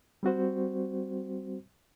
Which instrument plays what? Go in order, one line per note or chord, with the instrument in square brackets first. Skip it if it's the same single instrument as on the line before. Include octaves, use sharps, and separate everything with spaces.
[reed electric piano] G3 C4 F#4 C5